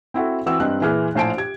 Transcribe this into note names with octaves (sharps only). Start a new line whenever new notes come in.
C4 E4 F#4 A4
E3 C4 F#4 E6
G2 C4 D#5 F#6
A#2 E3 G#4 F6
A#1 A2 C5 G#5 A5 D7
G4 G#6